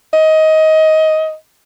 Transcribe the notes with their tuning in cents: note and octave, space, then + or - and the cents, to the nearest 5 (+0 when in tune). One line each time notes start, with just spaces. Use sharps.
D#5 +20